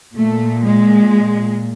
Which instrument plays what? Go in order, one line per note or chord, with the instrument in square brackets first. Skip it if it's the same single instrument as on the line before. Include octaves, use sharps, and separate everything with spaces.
[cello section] A#2 A3
G#3